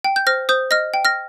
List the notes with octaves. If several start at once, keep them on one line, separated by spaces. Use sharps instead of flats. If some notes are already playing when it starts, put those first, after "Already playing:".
G5
G6
C5 F6 A#6
C5 D#6 G6
D#5 F6 A#6
G5
F6 A#6